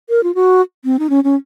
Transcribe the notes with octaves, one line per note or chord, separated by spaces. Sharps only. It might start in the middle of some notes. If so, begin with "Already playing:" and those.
A#4
F4
F#4
C4
D#4
C#4
C#4